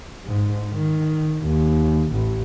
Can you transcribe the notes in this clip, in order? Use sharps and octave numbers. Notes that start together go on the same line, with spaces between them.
G#2
D#3
D#2
A1